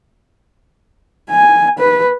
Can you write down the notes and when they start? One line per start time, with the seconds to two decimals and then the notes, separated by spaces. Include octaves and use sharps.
1.30 G#5
1.79 B4